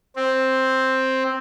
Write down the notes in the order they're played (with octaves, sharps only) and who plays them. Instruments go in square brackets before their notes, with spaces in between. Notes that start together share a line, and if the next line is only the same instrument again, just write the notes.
[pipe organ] C4